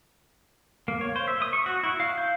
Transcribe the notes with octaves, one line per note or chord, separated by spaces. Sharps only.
A#3
C#5
C5
E5
D#6
C#6
F#4
E4
F5
G6